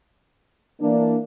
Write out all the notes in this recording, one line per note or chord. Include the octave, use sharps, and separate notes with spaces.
E3 A#3 D4